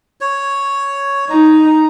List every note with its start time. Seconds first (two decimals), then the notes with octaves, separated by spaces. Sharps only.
0.21 C#5
1.30 D#4 A#5